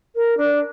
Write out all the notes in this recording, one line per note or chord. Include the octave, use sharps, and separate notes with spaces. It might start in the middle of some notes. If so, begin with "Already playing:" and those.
A#4
D4